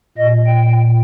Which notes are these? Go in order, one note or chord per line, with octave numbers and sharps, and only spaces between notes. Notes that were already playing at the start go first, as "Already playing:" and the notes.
A#2 D#5
G5